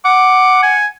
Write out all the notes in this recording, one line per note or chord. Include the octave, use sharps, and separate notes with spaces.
F#5 D6
G#5